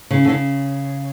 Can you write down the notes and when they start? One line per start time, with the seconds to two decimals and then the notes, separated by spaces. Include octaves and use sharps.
0.11 C#3
0.25 D3
0.29 C#3